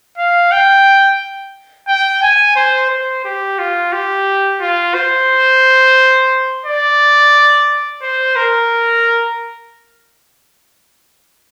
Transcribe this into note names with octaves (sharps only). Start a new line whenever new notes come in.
F5
G5
G5
G#5
C5
C5
G4
F4
G4
F4
C5
D5
C5
A#4